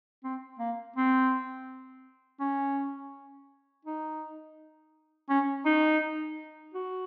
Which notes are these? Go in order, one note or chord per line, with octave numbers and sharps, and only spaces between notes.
C4
A#3
C4
C#4
D#4
C#4
D#4
F#4